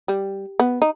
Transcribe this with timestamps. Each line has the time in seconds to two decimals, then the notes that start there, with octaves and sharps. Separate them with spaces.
0.08 G3
0.60 B3
0.82 D#4